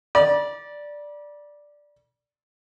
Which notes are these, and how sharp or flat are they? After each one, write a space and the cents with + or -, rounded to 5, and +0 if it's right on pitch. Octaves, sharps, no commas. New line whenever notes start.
D5 +0 B5 -45